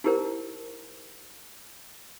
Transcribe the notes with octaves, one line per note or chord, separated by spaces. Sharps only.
D#4 E4 G4 A#4 C5